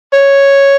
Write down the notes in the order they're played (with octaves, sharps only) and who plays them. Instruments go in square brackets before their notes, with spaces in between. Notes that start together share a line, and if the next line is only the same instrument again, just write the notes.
[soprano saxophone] C#5